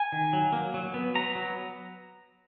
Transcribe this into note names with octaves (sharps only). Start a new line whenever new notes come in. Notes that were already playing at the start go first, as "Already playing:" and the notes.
Already playing: G#5
D#3
F#3
A#3
F#3
B3
B3 A#5
F#3